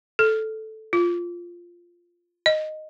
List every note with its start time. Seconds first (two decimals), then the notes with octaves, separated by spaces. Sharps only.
0.19 A4
0.93 F4
2.46 D#5